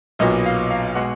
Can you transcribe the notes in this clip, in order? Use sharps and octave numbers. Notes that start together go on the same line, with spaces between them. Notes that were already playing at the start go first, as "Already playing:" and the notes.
B1 A#2 F#3 B3 D#5
F5
F5
B2 G#3 F#5